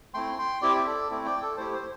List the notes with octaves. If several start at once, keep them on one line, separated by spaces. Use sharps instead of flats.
A3 C4 E4 G5 C6
G5 C6
C4 E4 G4 D5 G5
E5
A4 D5
A3 C4 E4
D5 G5
A4
A3 E4 G4 C5
C5